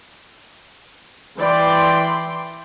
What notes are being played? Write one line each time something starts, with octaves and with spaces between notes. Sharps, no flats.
E3 D5 G5 C6